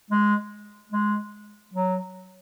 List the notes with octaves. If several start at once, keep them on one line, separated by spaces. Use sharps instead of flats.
G#3
G#3
F#3